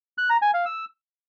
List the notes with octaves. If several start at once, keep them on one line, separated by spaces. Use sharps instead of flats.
F#6
A#5
G#5
F5
E6